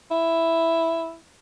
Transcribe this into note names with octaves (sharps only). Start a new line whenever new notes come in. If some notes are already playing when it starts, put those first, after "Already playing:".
E4